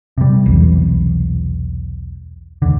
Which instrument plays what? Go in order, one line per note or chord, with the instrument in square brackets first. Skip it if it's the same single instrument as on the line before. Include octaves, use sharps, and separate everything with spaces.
[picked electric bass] C3 G3
[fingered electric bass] B1 E2 E3
[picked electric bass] D#2 D3